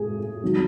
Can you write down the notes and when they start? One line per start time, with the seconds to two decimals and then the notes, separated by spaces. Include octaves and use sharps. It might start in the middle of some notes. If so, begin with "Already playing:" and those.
Already playing: A2 G#4
0.43 D#3 F#3